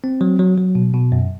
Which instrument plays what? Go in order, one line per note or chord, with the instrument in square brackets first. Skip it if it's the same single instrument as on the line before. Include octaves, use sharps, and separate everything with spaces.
[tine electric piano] C4
F#3
F#3
F#3
B2
B2
F#2